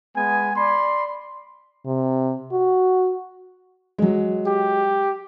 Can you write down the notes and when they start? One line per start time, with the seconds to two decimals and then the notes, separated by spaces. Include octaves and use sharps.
0.14 G#3 B3 G#5
0.56 D5 B5 C6
1.86 C3
2.52 F#4
3.98 F#3 G#3
4.47 G4